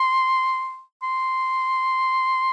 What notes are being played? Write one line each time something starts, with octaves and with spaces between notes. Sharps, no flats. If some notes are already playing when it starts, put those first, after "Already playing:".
Already playing: C6
C6